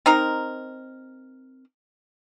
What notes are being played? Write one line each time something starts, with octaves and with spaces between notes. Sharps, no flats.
C4 D#4 A#4